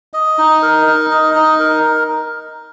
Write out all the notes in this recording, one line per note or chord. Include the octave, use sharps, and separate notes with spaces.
D#5
D#4
A#4
D#4
D#5
D#4
A#4